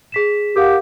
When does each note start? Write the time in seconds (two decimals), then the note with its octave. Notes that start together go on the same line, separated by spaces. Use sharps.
0.12 G#4 B6 E7
0.56 G4 A#4 F5 F#5